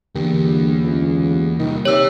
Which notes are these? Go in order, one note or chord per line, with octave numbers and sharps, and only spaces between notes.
E2 D3 A#3 G4
G1
C#2
C2 D#3
C3 B4 C#5 E5 E6